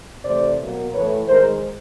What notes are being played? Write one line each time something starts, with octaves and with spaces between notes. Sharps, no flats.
C3 E3 A3 C5 D5
B2 F#3 A#3
A2 E3 A3 B4 C#5
D#3 G#3 A#4 C5